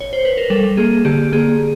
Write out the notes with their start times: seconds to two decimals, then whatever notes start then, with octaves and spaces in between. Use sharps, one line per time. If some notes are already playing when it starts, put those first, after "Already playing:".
0.01 C#5
0.13 C5
0.25 B4
0.38 A#4
0.50 G3 A4
0.77 A#3 G#4
1.05 D3 G4
1.32 A#3 G#4